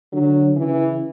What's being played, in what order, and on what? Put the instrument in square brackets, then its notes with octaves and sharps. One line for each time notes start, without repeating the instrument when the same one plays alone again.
[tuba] D3 [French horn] F#3
[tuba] C#3 [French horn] E3